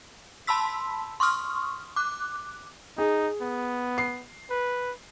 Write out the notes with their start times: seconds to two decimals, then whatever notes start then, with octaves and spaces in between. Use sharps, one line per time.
0.47 A5 B5 C6 E6 B6
1.20 C6 C#6 D#6 F6
1.96 D6 F#6
2.98 D#4 G#4
3.42 B3
3.98 C7
4.50 B4